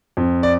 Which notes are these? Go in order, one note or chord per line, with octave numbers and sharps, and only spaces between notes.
F2
D5